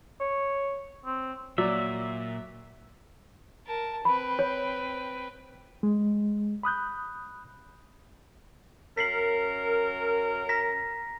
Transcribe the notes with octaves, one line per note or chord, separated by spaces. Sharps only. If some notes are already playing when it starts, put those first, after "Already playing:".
C#5
C4
A#2 F#3 D5 E5
A#4 A5
C4 B4 B5
C#5
G#3
B5 D#6 F#6 G6
F#2 C#4 A#4 B6 C7 F#7
A#5 A#6 B6